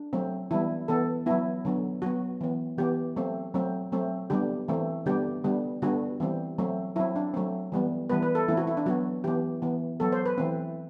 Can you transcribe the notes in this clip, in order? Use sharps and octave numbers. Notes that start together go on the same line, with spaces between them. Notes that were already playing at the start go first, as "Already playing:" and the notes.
Already playing: D4
F#3 A3 C4
E3 G3 B3 E4
E3 B3 A4
F#3 B3 E4
D3 F#3 B3
F#3 B3 F#4
E3 B3
E3 B3 G4
F#3 A3 C4
F#3 A3 C4
F#3 A3 C4
D3 G3 B3 G4
E3 A3 C4
D3 G3 B3 G4
D3 G3 B3
D3 G3 B3 F#4
E3 G3 C4
F#3 A3 C4
F#3 C4 E4
D4
F#3 A3 C4
E3 G3 B3
E3 G3 B3 B4
B4
A4
E3 A3 C4 E4
F#4
E4
D4
F#3 B3 F#4
E3 B3 G4
E3 B3
F#3 B3 A4
C5
B4
E3 A3 C4